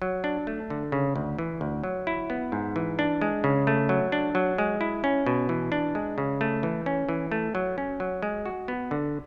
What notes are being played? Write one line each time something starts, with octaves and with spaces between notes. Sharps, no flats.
F#3
D4
A3
D3
C#3
D2
E3
D2
F#3
E4
B3
G#2
E3
D4
G#3
C#3
A3
F#3
D4
F#3
G#3
E4
C#4
B2
E3
D4
G#3
C#3
A3
E3
C#4
E3
A3
F#3
C#4
F#3
G#3
F#4
B3
D3